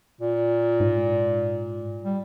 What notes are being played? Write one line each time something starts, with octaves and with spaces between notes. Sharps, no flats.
A#2
G#2
G3